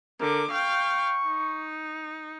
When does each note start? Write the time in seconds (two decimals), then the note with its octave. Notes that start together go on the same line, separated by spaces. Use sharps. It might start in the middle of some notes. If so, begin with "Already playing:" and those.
0.20 D3 A#4 D6
0.51 F5 G5 C#6
1.27 D#4